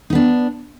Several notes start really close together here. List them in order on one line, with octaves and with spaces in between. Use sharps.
D#4 B3 D4